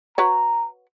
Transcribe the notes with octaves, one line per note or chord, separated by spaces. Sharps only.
F#4 B4 C#5 A#5